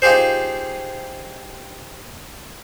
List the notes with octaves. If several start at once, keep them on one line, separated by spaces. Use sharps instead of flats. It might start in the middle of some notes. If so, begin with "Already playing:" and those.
D#4 F4 G4 G#4 C5